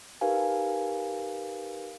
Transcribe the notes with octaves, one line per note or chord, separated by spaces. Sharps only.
D#4 G4 A#4 B4 F5 G#5